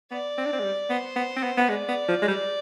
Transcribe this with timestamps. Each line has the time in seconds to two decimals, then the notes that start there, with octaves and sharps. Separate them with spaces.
0.11 B3 D5
0.38 C4
0.46 D4
0.53 C4
0.59 G#3
0.64 G3
0.90 B3 C5
1.16 B3
1.36 C4
1.43 B3
1.57 B3
1.69 G#3 D5
1.89 B3
2.08 F3
2.22 G#3
2.28 G3